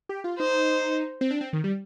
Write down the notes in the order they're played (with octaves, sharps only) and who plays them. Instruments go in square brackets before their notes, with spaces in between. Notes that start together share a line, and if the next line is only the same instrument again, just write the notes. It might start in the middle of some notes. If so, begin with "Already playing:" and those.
[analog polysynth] G4
F4
[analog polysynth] D#4 [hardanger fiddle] C5
[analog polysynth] C4
D4
C4
D#3
G3